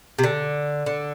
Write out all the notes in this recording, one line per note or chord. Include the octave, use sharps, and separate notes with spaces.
C3
D3
D3